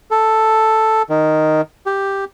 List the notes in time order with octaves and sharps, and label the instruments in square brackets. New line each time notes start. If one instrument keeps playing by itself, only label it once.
[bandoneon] A4
D#3
G4